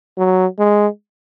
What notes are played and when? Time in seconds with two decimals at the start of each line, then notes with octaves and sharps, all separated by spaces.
0.18 F#3
0.59 G#3